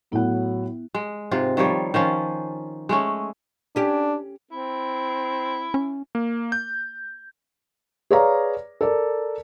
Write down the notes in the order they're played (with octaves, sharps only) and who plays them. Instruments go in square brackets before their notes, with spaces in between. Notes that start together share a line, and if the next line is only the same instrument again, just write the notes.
[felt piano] A2 F#5 [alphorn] F#3 [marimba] B3 E4
[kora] G#3
G#2 C3 F4
D#3 F3 G3 C#5
D#3 F3 C#4 F4
G#3 A3 C#4
[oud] C#4 G4 [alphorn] D4
[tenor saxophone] C4 [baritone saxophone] E4
[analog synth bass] C#4
[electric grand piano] A#3
G6
[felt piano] G#4 B4 C#5 D5 F5 A#5
A4 A#4 D5